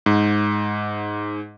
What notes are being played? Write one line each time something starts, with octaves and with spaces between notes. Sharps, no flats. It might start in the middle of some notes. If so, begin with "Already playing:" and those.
G#2